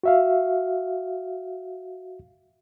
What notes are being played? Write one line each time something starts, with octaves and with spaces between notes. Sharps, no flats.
F#4 E5 F5